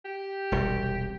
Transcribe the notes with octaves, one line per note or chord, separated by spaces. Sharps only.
G4
E1 C2 C3